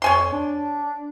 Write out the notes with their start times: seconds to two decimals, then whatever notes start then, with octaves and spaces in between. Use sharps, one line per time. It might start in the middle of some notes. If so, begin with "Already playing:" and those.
0.02 F2 C#5 G#5 C6
0.32 D4